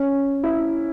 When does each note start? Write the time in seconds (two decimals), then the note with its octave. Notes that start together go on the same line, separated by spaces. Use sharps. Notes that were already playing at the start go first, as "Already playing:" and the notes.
Already playing: C#4
0.43 E4